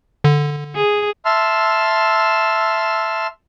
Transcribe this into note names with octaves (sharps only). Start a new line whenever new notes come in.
D3
G#4
E5 A5 C6 E6 F6